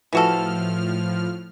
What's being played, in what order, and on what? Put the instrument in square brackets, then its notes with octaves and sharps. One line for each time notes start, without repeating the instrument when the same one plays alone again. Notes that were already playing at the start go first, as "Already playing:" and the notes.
[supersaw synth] A2 F3 F6 [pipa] E3 F#4 A4